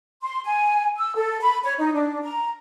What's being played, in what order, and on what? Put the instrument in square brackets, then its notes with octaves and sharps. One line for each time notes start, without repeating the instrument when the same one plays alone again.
[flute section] C6
G#5
E6
A4
B5
C#5
D#4
D4
A#5